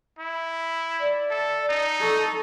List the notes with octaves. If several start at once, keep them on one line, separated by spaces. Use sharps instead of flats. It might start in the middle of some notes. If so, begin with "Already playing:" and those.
E4
D5
A4
D#4
A4 C#6